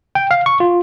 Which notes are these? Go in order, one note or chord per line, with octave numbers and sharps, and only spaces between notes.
G5
F5
C#6
F4